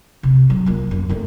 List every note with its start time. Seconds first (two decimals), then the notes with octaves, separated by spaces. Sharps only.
0.23 C3
0.50 F#3
0.66 A#3 F4
0.91 F#2
1.09 D#3 A3